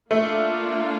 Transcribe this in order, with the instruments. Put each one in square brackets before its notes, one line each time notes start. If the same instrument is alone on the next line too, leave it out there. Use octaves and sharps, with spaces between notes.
[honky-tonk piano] A3 [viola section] A#3 D4 F4